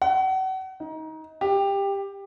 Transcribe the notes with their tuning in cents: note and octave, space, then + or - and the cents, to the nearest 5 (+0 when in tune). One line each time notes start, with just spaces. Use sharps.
F#5 +35
D#4 +25
G4 +15